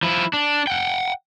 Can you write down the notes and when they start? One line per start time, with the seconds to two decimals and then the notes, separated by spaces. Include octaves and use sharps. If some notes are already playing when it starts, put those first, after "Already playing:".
0.03 F3 E4
0.33 D4
0.67 F#5 G5